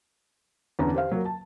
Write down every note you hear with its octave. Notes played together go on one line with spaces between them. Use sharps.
E2 D3 C#4 B4 A#5
G4 C5 F5
F#3 A#3
A5